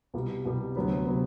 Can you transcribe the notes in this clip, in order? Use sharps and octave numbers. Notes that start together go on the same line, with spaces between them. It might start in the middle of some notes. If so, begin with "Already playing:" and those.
C2 B2 G3
C2 B2 G3
D2 C3 F#3 B3
C3 F#3 B3